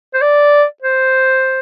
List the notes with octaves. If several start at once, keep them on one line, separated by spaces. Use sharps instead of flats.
C5
D5
C5